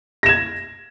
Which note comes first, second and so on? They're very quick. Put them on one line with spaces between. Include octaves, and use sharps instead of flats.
A#6 E7 G#6